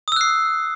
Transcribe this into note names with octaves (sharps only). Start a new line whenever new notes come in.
D#6 E6 F#6 C7